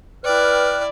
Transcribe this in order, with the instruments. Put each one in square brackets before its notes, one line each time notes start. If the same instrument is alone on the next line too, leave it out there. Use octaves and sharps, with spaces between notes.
[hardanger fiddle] E4 D5 [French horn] B4 [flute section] G5 F6 F#6